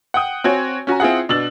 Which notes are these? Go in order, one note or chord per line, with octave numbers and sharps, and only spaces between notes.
F#5 G5 D#6
C4 F#4 C#5 G#5
C#4 F#4 G#5 A#5
C4 E4 F4 G#4 F#5
B2 D4 E6 A6 F#7